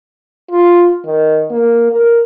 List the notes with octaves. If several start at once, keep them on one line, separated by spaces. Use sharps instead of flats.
F4
D#3
A#3
A#4